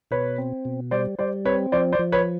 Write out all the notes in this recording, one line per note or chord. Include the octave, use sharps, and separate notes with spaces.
B2 B4 C#5
C4
B2
G3 C5 D5
G3 C5 D5
C4 B4 C#5
F3 C5 D5
C5 D5
F3
B4 C#5